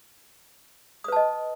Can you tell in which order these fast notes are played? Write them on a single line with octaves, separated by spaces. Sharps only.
D#6 B4 A5 D#5